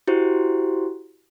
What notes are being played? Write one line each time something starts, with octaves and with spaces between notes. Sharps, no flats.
E4 F#4 G4 C5